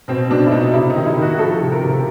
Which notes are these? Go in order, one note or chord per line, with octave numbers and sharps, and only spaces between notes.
B2 C4
B2 D4
E4
B2 D#4
C3 E4
D#4
D#3
E4
D#3 F#4
F3 A4
C3
A#4
C3